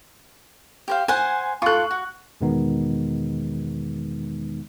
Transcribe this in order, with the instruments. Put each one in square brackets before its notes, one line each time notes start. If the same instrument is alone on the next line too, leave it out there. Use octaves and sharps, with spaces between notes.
[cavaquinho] G4 C5 F5
[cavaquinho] C5 F#5 [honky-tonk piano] G#5
[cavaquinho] F4 A4 [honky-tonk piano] C#6 F#6
[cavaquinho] F#4
[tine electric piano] E2 B2 D#3 G#3 B3 D#4